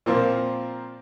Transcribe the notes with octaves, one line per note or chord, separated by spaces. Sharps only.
A#2 F3 A#3 C4 A#4 C5